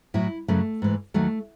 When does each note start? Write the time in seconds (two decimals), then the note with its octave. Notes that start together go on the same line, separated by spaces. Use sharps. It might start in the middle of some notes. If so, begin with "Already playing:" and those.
0.14 A2 F#3 E4
0.48 F#2 C#3 F#3 A3
0.82 G#2 E3
1.14 D#2 D#3 F#3 A3